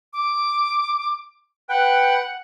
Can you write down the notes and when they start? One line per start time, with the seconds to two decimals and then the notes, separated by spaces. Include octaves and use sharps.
0.13 D6
1.69 B4 F#5 G5